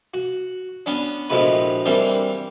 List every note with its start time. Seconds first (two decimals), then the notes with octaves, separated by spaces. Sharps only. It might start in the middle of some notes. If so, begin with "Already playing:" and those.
0.14 F#4
0.86 B3 C#4 D4
1.30 A#1 A2 F3 G#3 F#4 B4
1.85 E3 G3 A#3 C4 D4